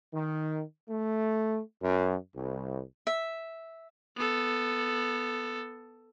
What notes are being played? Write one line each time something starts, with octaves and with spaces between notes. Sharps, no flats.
D#3
A3
F#2
C2
E5
B3 A4